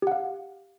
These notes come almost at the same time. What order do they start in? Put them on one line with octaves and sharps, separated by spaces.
G4 F#5 F5